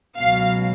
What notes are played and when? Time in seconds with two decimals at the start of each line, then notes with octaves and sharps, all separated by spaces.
0.19 C#2 B2 F#3 F5